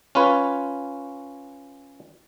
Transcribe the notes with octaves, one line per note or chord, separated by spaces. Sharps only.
C#4 F4 B4 C#5